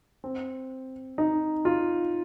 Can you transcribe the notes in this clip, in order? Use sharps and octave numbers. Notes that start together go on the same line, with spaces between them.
C4
D#4
F4